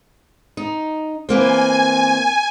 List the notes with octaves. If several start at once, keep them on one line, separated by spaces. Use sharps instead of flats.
D#4
E3 A#3 C4 G#5